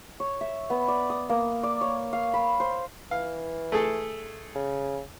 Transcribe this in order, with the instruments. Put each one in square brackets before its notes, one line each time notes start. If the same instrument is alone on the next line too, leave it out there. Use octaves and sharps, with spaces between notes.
[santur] C#5
E5
B3
D5
D#6
A#3
D5
C#5
F5
B5
C5
[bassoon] E3 [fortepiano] F5
[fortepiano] A3 G#4 A4
[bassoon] C#3